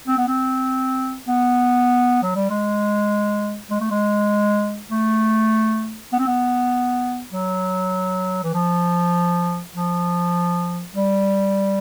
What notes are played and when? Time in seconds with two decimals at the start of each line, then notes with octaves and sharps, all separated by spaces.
0.07 C4
0.18 B3
0.28 C4
1.28 B3
2.23 F#3
2.35 G3
2.50 G#3
3.70 G#3
3.80 A3
3.91 G#3
4.91 A3
6.12 B3
6.19 C4
6.27 B3
7.33 F#3
8.44 E3
8.54 F3
9.75 F3
10.95 G3